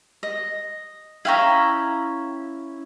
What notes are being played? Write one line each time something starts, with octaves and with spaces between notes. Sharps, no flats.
D#5
C#4 E4 F5 G5 A#5